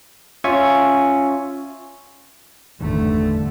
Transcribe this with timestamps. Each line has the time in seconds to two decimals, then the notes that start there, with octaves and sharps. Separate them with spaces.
0.44 C#4 F4 E5 G#5 C#6
2.80 D1 G1 E2 G2 D3 D#3 A3